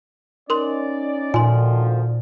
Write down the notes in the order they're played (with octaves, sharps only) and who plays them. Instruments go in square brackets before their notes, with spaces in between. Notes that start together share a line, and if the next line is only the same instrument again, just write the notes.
[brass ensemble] C#4 D#4 D5 [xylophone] A#4 C6
[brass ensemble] D2 D#3 F3 [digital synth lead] A#2 [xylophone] G#5 C6